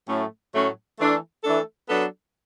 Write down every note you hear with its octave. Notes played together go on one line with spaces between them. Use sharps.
A2 F#3 A3 C#4
A2 F#3 A3 C#4
E3 A3 D4 A4
E3 A3 D4 A4
F#3 B3 D4 A4